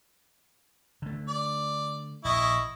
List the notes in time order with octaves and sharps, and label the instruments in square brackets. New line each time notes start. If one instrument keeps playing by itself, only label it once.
[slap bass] D3 A3
[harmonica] D5
[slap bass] A#1 [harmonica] E4 D#5 C#6